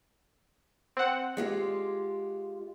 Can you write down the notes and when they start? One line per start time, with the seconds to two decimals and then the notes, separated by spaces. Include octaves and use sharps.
0.97 C4 F#5
1.37 G#3 F4 G4